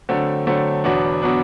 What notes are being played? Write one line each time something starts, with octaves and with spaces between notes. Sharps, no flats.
D3 F#3 A3 C4
D3 F#3 A3 C4
E2 B2 F#3 B3 D4
B2 F#3 B3 D4